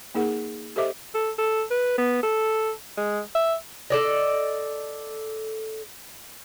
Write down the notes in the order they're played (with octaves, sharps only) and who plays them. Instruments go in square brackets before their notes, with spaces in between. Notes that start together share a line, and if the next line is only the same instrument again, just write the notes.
[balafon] A#3 D#4 G#4 A#4 F#5
G4 A4 C5 D#5 E5 D6
[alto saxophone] A4
A4
B4
B3
A4
G#3
E5
[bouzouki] A4 D5 D#5